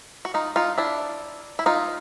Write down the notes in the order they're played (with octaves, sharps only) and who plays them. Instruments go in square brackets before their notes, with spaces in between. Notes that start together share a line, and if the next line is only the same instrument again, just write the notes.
[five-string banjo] F#4
D#4 F4
D#4 F4
D4 E4
E4
D#4 F4